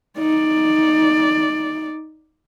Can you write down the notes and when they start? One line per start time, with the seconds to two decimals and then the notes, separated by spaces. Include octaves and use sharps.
0.18 D#4 D5